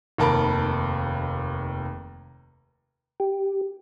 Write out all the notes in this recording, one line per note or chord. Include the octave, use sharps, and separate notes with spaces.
F1 D#2 A#4 A5 B5 D7
G4